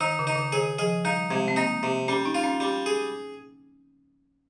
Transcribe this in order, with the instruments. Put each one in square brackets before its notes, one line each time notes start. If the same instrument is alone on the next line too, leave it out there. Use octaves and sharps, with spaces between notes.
[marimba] D#3 [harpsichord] D#4
[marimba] C#3
[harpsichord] D#4
[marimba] C#3
[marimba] D#3 [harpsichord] G#4
[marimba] F3 [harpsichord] G#4
[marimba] G3 [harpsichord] D#4
[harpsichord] C3 [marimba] G#3
[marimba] C4
[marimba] A#3 [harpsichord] D#4
[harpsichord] C3
[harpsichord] G3 [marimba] C#4
[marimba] D#4
[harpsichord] F4
[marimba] C#4
[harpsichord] G3
G#4